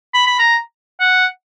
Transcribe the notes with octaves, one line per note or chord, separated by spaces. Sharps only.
B5
B5
A#5
F#5